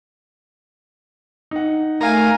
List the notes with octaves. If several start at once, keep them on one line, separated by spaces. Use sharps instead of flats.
D#4 F#5
A3 A#4 F5 G#5 A#5